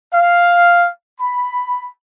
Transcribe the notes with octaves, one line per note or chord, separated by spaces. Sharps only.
F5
B5